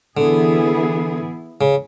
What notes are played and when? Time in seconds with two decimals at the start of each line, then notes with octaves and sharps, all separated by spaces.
0.17 D3 E3 B3 E4 G#4
1.61 C#3